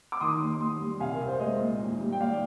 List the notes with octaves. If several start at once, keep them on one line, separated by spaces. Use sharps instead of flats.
D6
D#3 C6 D#6
D#2
D#2 C6 D#6
G3
C2 F5 G#5
A#4
C2
C5
G#3 C5 D#5
A#2
D#2
G3
G5
D#2 D5 F5